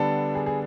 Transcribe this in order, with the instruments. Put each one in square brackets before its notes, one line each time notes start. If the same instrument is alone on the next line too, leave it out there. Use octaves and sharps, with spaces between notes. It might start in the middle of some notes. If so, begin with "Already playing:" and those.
Already playing: [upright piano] D3 G3 B3 D4 A4
G#4
G#4